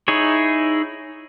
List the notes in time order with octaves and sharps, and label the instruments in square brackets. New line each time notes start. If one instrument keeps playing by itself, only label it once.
[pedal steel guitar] D#4 E4 G#4 C#5